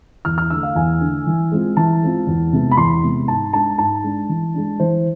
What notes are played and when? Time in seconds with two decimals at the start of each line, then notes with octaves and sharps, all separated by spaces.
0.25 E2 F6
0.38 F6
0.50 D3 A3 E6
0.63 F5
0.75 E2 G#5
1.01 D3 A3
1.26 E3
1.52 G#3 C4 F4
1.77 E3 A5
2.02 G#3 C4 F4
2.27 E2
2.53 C3 G#3 B3
2.71 B5
2.77 E2 C6
3.03 C3 G#3 B3
3.28 G#2 A5
3.53 G#3 D4 A5
3.78 G#2 A5
4.04 G#3 D4
4.29 E3
4.54 G#3 D4
4.80 E3 C5